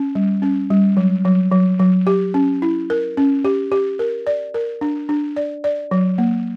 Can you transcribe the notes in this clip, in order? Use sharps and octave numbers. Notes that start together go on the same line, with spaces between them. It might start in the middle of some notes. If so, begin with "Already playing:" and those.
Already playing: C#4
G3
C#4
G3
F#3
F#3
F#3
F#3
G4
C#4
E4
A#4
C#4
G4
G4
A#4
D5
A#4
D4
D4
D5
D5
F#3
A#3